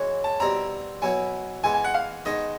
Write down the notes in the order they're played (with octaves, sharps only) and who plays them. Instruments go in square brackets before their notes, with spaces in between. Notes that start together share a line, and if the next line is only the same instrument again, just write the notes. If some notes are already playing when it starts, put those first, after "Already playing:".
Already playing: [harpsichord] E3 G#3 C#4 F#4
[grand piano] A5
[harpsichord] B2 G3 C4 E4 [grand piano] A#5
[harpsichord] B2 F#3 B3 E4 [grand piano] G#5
[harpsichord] E3 G#3 B3 [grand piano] G#5
[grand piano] G#5
F#5
F5
[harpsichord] D#3 G#3 B3 D#4 [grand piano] D#5